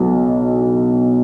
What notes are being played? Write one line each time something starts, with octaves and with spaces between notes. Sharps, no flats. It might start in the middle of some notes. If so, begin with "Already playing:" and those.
Already playing: B1 B2 F#3